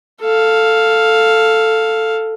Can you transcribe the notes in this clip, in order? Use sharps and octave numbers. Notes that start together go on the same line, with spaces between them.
A4 F5